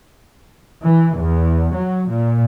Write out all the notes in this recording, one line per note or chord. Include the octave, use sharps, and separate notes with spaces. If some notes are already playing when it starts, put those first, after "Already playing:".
E3
E2
F#3
A#2